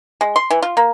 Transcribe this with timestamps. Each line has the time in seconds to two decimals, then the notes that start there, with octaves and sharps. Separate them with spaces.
0.21 G#3
0.36 C6
0.51 E3
0.62 F4
0.77 A#3